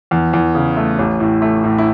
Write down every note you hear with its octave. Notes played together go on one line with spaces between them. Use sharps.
E2
E2
C#3
A3
A1
A2
A3
A2
E4